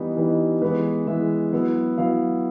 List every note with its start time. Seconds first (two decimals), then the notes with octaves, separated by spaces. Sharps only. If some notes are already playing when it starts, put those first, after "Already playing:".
Already playing: E3 G3 B3 D#4 B4
0.17 E3 G3 B3 D#4
0.62 E3 G#3 B3 B4
1.07 E3 G#3 B3 E5
1.53 F#3 B3 E4
1.98 F#3 B3 E4 F5